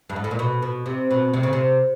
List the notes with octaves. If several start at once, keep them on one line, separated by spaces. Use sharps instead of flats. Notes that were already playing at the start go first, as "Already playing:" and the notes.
G2
G#2
A2
A#2
B2
B2
C3
B2
C3
C#3
C3